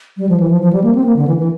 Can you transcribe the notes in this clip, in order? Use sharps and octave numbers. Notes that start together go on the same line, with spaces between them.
G3
F3
E3
F3
F3
G3
A#3
C4
A#3
D3
E3
E3